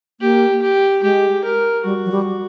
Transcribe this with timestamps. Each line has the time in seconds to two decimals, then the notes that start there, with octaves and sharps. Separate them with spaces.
0.21 A#3 G4
0.62 G4
1.02 G#3 G4
1.44 A#4
1.84 G3 F#4
2.06 F#3
2.11 G3